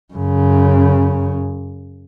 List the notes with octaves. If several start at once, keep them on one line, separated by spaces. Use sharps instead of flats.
F#2 C#3